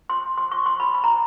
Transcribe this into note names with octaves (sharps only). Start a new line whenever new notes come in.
C6
C6
C#6
C6
B5
B5
A#5